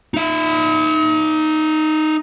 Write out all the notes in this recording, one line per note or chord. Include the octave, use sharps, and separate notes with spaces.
D#4 E5